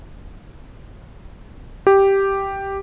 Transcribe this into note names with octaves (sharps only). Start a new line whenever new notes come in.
G4